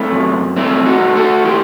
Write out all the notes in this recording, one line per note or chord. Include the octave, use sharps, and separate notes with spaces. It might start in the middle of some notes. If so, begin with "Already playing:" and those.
Already playing: A3 C4 E4
F#2
A3 C4 E4
D#4 F#4
A3
F#4 A4
E4 G4